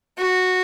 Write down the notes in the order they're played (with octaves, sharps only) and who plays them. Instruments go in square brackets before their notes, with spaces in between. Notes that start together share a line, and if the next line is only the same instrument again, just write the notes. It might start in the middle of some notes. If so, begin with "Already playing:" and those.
[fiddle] F#4